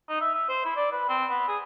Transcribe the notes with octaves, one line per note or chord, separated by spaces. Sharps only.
D#4
E5
E5
C5
E4
D5
B4
C4
B3
G#4